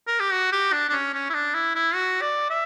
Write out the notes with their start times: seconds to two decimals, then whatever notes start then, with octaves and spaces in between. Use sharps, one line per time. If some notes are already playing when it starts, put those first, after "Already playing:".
0.07 A#4
0.20 G4
0.32 F#4
0.52 G4
0.72 D4
0.89 D4
0.93 C#4
1.14 C#4
1.30 E4
1.34 D4
1.54 E4
1.75 E4
1.94 F#4
2.22 D5
2.50 E5